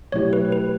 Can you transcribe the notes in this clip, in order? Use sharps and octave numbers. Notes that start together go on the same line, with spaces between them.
B2 F#3 A3 E4 G4 C#5
B4
B4